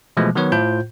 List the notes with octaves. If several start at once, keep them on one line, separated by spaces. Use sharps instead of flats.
B2 E3 F3 G#3 A3
D#3 F#3 B3 B4 C#5
A2 F4 C5 G6